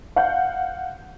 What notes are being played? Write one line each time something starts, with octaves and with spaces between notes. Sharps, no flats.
F5 F#5 G6